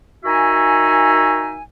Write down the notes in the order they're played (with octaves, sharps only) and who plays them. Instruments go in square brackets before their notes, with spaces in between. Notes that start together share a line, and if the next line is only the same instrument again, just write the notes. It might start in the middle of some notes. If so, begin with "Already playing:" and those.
[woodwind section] D#3 D#4 F#4 E5 G#5